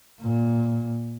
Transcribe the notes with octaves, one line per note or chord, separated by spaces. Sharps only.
A#2